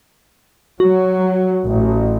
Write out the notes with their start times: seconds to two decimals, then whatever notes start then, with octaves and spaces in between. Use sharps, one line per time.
0.80 F#3 F#4
1.64 A1